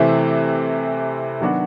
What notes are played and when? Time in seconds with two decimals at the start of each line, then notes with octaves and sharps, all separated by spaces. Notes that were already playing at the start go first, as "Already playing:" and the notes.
Already playing: C3 E3 A3 C4 E4
1.41 D#3 F#3 B3 D4 F#4